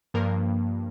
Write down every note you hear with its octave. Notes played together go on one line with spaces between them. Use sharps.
G2 F3 A#3 A#4